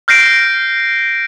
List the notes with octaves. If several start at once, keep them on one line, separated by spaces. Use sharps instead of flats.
F6 G6 A#6 C7 D7